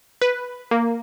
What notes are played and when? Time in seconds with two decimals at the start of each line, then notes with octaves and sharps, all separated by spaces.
0.22 B4
0.71 A#3